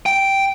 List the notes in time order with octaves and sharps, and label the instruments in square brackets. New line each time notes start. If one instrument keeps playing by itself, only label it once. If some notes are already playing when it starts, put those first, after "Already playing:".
[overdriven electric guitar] G5